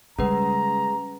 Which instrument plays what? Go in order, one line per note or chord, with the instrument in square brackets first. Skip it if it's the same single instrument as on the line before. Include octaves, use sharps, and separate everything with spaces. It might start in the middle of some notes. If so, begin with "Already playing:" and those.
[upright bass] C#3 G3 [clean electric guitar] G#3 [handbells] C#4 B4 [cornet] A#5